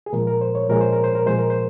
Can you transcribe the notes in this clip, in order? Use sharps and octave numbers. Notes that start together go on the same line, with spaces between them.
G#4
A#2 F3 G#3 A#4
A#4
C5
C#5
A#2 F3 G#3 A#4
C5
A#4
C5
A#4
A#2 F3 G#3 C5
A#4
C5